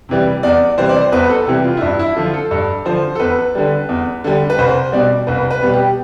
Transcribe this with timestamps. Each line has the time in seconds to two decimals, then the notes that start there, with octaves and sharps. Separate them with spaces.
0.09 C3 E3 G3
0.43 E2 D5
0.78 C3 E3 G3 C5
0.89 D5
1.01 C5
1.12 E2 B4
1.29 A4
1.47 C3 E3 G3 G4
1.64 F4
1.77 E4
1.81 G2 D4
1.99 E4
2.16 D3 F3 F4
2.34 A4
2.51 G2 A4
2.85 D3 F3 C5
3.15 A4
3.20 E2 B4
3.55 D3 G3
3.89 E2
4.24 D3 G3
4.50 B4
4.58 C2 C5
4.92 B2 G3 D5
5.27 C2 B4
5.51 B4
5.62 B2 G3
5.74 G4